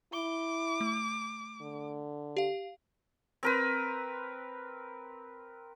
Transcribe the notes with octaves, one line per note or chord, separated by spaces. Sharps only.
E4 D6 G7
A3
D3
G4 F5
C4 A#4 B4